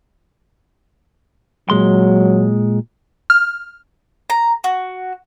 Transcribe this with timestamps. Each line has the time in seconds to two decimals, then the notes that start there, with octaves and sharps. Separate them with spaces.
1.70 A#2 F#3 G#3 C6
3.30 F6
4.30 A#5
4.64 F#4